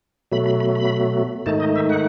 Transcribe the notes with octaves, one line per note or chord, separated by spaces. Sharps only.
B2 F#3 A3 B5
B5
B5
B5
G#2 D#3 A3 D#4 A5
D#5
E5
F#5